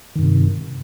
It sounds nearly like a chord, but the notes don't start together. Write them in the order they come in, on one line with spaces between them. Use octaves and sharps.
D#3 G2 C3